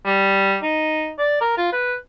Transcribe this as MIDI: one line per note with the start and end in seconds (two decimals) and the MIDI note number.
0.06 0.56 55
0.62 1.11 63
1.19 1.41 74
1.41 1.56 70
1.57 1.69 65
1.72 1.94 71